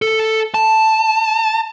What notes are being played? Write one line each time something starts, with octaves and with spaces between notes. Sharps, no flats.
A4
A5